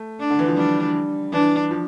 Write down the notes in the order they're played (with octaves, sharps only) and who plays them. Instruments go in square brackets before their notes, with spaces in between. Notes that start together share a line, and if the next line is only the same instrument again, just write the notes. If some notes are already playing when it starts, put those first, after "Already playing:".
Already playing: [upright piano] A3
[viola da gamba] D4
[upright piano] D3
E3
F3
[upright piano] G3 [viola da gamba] D4
[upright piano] E3 [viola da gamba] D4
[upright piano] F3